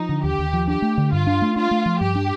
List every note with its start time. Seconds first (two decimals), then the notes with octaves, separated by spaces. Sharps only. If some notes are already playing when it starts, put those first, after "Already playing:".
Already playing: F3 D#4
0.09 D3
0.23 D#2 G4
0.39 D#2
0.53 F3
0.68 D4 G4
0.82 A3
0.98 D3
1.12 G2 F4
1.27 D4
1.42 A3
1.56 D4 F4
1.71 A3
1.86 F3
2.01 G2 G4
2.15 D4